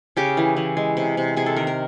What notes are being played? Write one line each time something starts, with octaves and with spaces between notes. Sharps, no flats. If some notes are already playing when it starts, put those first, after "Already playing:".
C#3 G4
E3
E3
G#3
C3
C3
C3 G#4
A4
D#3 A#4
A#4